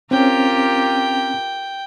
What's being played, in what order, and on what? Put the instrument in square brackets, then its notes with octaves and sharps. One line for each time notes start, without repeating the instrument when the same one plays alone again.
[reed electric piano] C4 C#4 [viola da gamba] F4 G4 A#4 [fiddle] G5